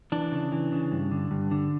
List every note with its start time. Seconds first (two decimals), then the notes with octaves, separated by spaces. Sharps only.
0.12 E3 D4
0.32 C#3
0.52 E3
0.72 C#3
0.92 G2
1.11 D3
1.31 G2
1.51 D3